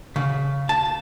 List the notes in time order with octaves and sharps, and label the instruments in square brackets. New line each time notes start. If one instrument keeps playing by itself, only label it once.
[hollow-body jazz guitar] C#3
A5